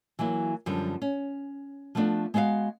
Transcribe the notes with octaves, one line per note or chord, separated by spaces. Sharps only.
E3 F#3 A#3 E4
F#2 D3 F3 G3
C#4
F3 A3 B3 C4 D4
G#3 B3 F#4 D#5 F5